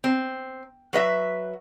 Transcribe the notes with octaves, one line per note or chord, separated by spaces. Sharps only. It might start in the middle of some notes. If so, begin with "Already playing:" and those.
C4
F#3 B4 D#5 E5